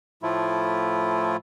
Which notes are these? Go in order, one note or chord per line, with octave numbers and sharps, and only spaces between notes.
A2 F3 A3 E4 F4